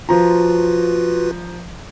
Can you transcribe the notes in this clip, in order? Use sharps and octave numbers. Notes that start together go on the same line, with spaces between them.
F3 F4 F#4 B4 A#5